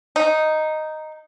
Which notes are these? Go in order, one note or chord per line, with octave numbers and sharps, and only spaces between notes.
D#4